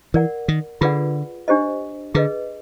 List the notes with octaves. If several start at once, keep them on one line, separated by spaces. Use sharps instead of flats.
E3 A#4 D5 F#5
D#3
D3 F4 G#4 B4 D5 F#5
D4 G4 C5 D#5
D3 G#4 B4 D#5